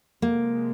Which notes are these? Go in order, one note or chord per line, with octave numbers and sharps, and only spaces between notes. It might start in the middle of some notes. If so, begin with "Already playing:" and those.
C3 F3 G#3 A#3